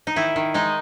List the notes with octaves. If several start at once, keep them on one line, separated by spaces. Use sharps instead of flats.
D#4
D#3 E4
D#3
G#3 D#4